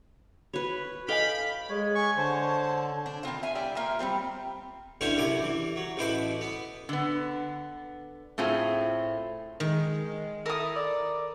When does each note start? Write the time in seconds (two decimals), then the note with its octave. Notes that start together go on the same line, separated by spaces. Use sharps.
0.54 F#4 B4 C#5
1.08 A4 D#5 F5 G5 G#5 B5
1.70 G#3 C#5
1.95 G#5 C#6
2.17 D3 C5 A5
3.06 D4
3.23 D#3 B3 C4 F4
3.43 E5 F5 G#5
3.55 G3 D4 E4 G4
3.76 A#3 F4 E5 G5
3.99 G3 G#3 C4 G4
5.01 B1 D3 C#4 E4 C5 C#6
5.17 F#2 C3 E4 G#5 D6
5.42 E3
5.76 F#3
5.97 A1 B2 E4 C5 B5 D6
6.41 B3
6.89 D3 B3
8.38 A2 A3 C4 F4 G#4
9.60 D#3 G#3
10.46 E4 A4 A#4 D#6
10.75 D5